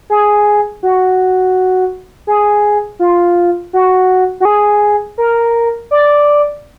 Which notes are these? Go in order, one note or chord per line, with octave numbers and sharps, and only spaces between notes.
G#4
F#4
G#4
F4
F#4
F#4
G#4
A#4
D5